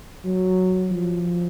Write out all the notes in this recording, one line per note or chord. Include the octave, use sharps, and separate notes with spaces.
F#3
F3